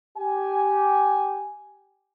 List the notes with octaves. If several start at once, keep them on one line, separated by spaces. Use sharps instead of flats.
G4 G#5